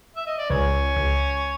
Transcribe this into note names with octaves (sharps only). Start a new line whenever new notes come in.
E5
D#5
D5
C#2 C#4 C#5
C#2